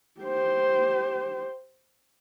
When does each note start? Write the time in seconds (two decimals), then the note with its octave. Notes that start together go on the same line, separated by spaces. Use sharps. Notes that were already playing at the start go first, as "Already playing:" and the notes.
0.21 G4 C5